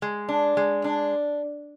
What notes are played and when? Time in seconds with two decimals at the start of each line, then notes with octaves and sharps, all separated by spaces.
0.02 G#3
0.29 D4
0.57 G#3
0.84 D4